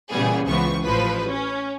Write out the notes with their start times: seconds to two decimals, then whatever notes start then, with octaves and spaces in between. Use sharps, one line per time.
0.11 A#2 C#3 E3 G3 B3 G#4
0.47 C#2 E3 F3 B3 C#6
0.83 A1 F3 B4
1.28 C#4